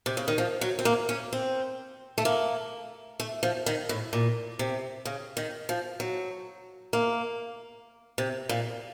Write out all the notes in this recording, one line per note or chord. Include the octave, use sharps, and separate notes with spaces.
C3
C#3
D#3
F3
F#3
C4
A#3
C#4
C4
A3
A#3
A3
F3
D#3
A2
A#2
C3
C#3
D#3
F3
F#3
A#3
C3
A#2